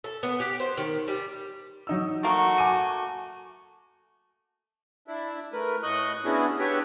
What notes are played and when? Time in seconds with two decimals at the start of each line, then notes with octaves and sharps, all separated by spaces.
0.04 A4
0.23 B3
0.40 G4
0.60 C5
0.77 D#3
1.08 G3
1.87 F#3 D#4 E6
2.23 A3 A#3 F#4
2.58 G#5 D6 D#7
5.08 D4 E4
5.53 A3 A#4 B4
5.83 A2 D#5 C#6 D#6 F#6 G6
6.25 B3 C#4 D4 E4 F#4 G#4
6.59 B3 D4 G4 B4 C#5 E5